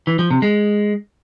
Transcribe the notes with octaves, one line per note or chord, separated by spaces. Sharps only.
E3
F3
C3
G#3